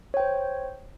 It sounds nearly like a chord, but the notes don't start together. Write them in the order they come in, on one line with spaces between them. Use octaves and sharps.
C#5 G5 C5